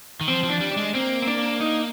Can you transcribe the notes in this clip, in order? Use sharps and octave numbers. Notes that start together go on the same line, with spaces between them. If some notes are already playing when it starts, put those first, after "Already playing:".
D#3
F3 C4
F3
D4
G3
D4
G#3
A#3 C4
C4
D4
D#4